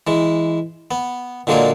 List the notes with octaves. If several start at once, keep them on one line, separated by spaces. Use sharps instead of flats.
E3 G#3
B3
A#2 D3 F#3 G#3 A#3 G#4